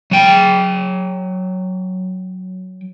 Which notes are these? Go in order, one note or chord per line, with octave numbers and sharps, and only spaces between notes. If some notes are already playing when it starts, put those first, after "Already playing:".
F#3 G5